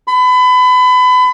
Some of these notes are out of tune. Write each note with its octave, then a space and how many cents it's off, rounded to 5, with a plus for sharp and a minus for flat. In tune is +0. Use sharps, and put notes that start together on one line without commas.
B5 +30